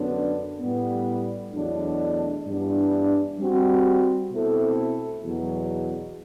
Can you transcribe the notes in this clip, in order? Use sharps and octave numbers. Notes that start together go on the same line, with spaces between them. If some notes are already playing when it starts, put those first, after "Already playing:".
Already playing: F#2 D3 F#3 B3 D4
A2 G3 B3
E2 B2 F#3 A3 D4
G2 E3 G3 B3 D4
G3 C4 F#4
B2 A3 C4 E4 A4
E2 B2 F#3